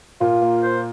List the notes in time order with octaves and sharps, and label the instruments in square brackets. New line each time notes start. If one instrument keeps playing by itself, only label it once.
[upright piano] A#2 [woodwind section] F4
[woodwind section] A#3
C5